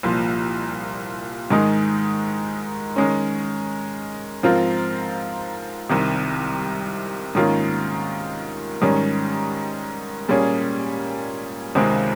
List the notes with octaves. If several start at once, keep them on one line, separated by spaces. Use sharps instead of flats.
C2 A#2 F3
G#2 D#3 G#3 D#4
D#3 G#3 C#4
G#2 F3 C4 F4 A#4
C2 C3 D#3
G#2 D#3 A#3 C#4 F4
G#2 D#3 G3 C#4
A#2 G3 A#3 C#4 G#4
C#2 C3 D#3 G#3 C4